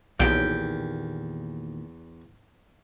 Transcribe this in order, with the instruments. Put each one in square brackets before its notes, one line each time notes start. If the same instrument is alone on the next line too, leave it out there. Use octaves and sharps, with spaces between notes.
[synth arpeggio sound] B1 [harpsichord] E2 [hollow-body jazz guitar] A#2 D#3 G4 [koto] G5